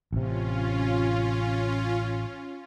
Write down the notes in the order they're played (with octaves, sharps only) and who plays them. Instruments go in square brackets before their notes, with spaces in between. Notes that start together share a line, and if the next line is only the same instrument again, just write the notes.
[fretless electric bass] A1 C3 [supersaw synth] C#4 F4